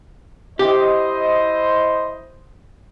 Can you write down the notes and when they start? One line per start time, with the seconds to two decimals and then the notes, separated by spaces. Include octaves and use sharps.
0.59 E4 G4 C5 D#5